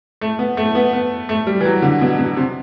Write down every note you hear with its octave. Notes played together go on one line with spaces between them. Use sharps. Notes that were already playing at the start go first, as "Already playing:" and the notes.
A3
B3
A3
B3
B3
A3
G3
E3
F#3
D3
B2
B2
C3